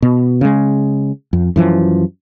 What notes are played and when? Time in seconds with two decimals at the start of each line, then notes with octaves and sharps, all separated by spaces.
0.02 B2
0.41 C#3 G#3
1.33 F2
1.56 F#2 E3 F3